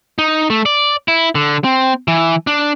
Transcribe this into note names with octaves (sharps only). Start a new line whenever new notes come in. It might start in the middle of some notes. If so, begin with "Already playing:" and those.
D#4
A3
D5
E4
D3
C4
E3
D4